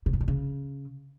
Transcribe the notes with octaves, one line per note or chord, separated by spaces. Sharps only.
C3
G2
A#2
C#3